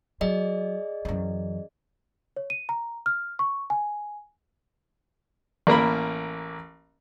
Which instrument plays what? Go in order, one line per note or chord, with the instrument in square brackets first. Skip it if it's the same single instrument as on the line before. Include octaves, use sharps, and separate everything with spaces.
[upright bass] F#3 [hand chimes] G#4 D5 D#5
[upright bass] F#2 E3
[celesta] C#5
D#7
A#5
F6
C#6
G#5
[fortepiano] A1 A#3 A#4 B5